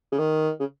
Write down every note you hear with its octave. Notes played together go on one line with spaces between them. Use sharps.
C#3
D#3
C#3